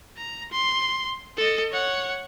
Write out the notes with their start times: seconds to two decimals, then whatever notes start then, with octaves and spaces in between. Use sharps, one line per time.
0.17 A#5
0.51 C6
1.37 A4 D#5
1.72 C#5 F#5